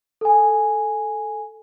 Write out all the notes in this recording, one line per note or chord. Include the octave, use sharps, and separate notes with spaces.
A4 G#5